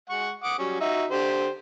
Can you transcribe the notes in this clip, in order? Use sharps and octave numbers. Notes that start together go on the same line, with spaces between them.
G#3 F#5 C#6
F#5 D6 D#6
F#3 G3 C#4
D#4 F#4 E5
D3 G4 C5